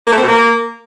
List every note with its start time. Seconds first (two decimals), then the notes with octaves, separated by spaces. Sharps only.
0.07 A#3
0.12 A3
0.17 C4
0.23 B2
0.28 A#3